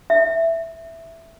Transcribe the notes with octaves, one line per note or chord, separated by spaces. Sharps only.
E5